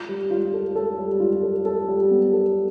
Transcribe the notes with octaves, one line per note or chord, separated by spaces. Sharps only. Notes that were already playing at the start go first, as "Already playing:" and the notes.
Already playing: F4
G3
F4
A4
A4
G3
F4
A4
A4
G3
B3
A4